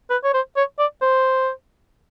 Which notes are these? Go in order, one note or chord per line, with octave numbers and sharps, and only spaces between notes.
B4
C#5
C5
C#5
D5
C5